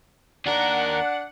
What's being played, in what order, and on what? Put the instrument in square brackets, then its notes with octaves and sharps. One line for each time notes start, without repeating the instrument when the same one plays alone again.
[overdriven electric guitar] D#2 A#4 [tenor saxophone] D4 [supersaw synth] F#5